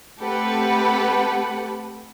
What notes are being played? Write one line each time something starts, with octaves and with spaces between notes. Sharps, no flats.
A3 C4 G4 A4 B4 F#5